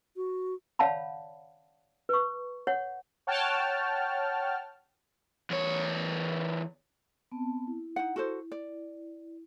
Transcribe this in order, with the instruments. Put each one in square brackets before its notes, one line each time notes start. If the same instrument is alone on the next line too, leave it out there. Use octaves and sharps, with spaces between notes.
[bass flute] F#4
[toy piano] C#5 D5 F5 F#5 A5 B5
B4 C#6
C#5 F#5
[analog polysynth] C#5 F#5 G5 A5 F6
[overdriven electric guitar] E2 C#5
[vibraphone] B3 C4 A5
E4
[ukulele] D#4 F#5
F#4 A4 C5
D5